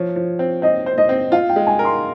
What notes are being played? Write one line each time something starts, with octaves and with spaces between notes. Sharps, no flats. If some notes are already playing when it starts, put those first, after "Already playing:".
Already playing: F3 C#5
F3
C4
C4 D#5
C5
D#5
C4
F4 F5
G5
G#3
G#5
A#4
C6